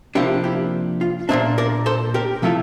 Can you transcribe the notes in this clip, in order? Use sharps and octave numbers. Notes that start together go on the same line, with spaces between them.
C3 F3 A#3 D4 E4 G4
E4 G4
F4
A#2 F3 A#3 D4 C5 E5
A#4 D5
A4 C5
G4 A#4
C3 F3 A3 E4 F4 A4